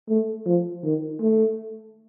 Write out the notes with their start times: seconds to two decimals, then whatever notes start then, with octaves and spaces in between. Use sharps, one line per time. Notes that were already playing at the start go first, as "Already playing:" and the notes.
0.09 A3
0.46 F3
0.83 D#3
1.21 A3